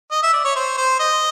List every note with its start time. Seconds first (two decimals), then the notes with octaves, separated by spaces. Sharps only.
0.11 D#5
0.23 E5
0.33 D5
0.44 C#5
0.56 C5
0.77 C5
1.00 D#5